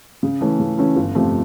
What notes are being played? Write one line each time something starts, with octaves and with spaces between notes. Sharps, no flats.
C#3
E3 A3 C#4
C#3
E3 A3 C#4
G1
F2 C3 F3 A3